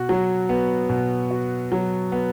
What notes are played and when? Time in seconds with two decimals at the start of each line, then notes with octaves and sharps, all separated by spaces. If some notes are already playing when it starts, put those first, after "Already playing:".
Already playing: B2 F#4
0.09 F#3
0.49 B3
0.89 B2
1.31 F#4
1.72 F#3
2.12 B3